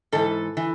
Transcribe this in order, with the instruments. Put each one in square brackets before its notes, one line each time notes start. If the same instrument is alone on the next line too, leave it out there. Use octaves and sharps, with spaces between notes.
[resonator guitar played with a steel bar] G#2 E3 A4
E3